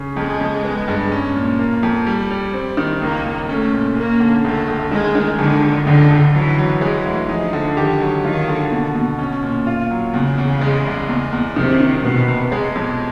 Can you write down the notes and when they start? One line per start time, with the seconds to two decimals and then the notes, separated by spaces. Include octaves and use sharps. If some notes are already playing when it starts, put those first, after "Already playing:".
Already playing: C#3 C#4
0.16 F2 G#3
0.40 F2
0.64 B3
0.88 G2
1.12 C#4
1.36 A#2
1.59 A#3
1.83 F2
2.07 G3
2.31 G3
2.54 C4
2.77 D#3
3.01 C#2 A#3
3.25 C#2
3.49 A3 C#4
3.72 A#2
3.96 A#3 C#4
4.20 D3
4.44 C#2 A3
4.68 C#2
4.92 D#3 G#3
5.15 D#3
5.38 F2 D3
5.63 F2
5.86 C#2 D3
6.10 C#2
6.34 E3 F#3
6.58 F#3
6.81 E3 G#3
7.06 D2
7.29 F3 D#4
7.53 D3
7.76 D#3 G4
8.00 F#3
8.24 D#3 F4
8.48 D3
8.72 B2
8.95 B2
9.19 C#4
9.43 A#2
9.67 F4
9.91 F#3
10.14 E2 C#3
10.38 E2
10.61 G#3
10.86 C2
11.09 E2
11.32 E2
11.56 C3 D#3
11.80 D#3
12.04 B2 B3
12.28 C3
12.52 B2 G#3
12.75 F2